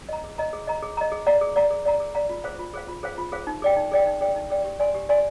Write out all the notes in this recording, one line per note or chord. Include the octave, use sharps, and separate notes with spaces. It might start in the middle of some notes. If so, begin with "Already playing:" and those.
D#5 A#5
G#4
D#5 A#5
G#4
D#5 A#5
G#4
D#5 A#5
G#4
D5 F5 A#5
G#4
D5 F5 A#5
G#4
D5 F5 A#5
G#4
D5 F5 A#5
F4
G#4 C5 F5
F4
G#4 C5 F5
F4
G#4 C5 F5
F4
G#4 C5 F5
D#4
G#4 D5 G5
D#4
G#4 D5 G5
D#4
G#4 D5 G5
D#4
G#4 D5 G5
G4
D5 G#5 C6
G4
D5 G#5 C6